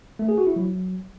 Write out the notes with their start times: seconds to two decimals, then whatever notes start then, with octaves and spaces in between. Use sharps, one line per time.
0.19 A3
0.28 G#4
0.38 F#4
0.47 E4
0.56 F#3